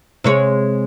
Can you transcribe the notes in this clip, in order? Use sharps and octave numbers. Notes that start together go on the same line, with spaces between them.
C3 G#3 C#5